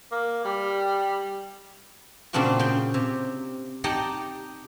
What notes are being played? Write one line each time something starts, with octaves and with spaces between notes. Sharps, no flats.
A#3
G3
A#2 C#3 C4 D4 F4 F#4
C#3 G5
C3
D#4 G4 D5 F#5 A5 A#5